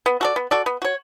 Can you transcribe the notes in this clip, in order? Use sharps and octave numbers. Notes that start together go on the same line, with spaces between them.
B3
F#4 A4 D5
B3
F#4 A4 D5
B3
F#4 C#5